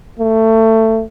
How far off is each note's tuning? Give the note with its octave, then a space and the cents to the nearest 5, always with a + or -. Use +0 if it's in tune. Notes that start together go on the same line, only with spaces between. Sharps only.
A3 +20